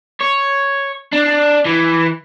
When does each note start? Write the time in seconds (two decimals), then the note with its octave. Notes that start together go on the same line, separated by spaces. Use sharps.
0.21 C#5
1.13 D4
1.66 E3